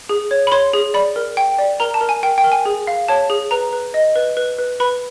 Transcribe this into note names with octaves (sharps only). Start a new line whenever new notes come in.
G#4
C#5
B5
C#5 C6
G#4
D5 B5
A#4
G5
D5
A#4 A#5
A5
A#4
G#5
A#4 G5
G5
A#4
G#5
G#4
F5
C#5 A5
G#4
B4 A#5
B4
D#5
B4
B4
B4
B4 B5